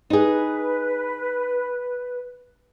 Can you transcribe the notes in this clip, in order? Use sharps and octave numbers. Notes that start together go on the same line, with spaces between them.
D#4 G#4 B4